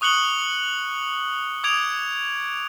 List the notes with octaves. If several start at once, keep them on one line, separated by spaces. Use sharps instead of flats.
C#6 D#6 F#6 C#7 F#7 G7
D6 D#6 G#6 D7 F7